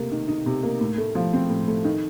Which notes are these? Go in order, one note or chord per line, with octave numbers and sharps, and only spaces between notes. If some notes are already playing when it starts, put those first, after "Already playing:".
Already playing: C3 A3 A#3
D#3
D#4
C3
A#3
A2
A3
F3
C4
A2
A3
D#3